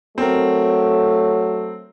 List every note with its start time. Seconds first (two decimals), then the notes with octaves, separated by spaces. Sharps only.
0.18 F#3 A3 C4 A#4